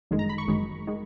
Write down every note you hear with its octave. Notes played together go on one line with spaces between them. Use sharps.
G1 F#2 D#3 G#3
A#5
B5
C#6
G1 F#2 D#3 G#3
D#3 G#3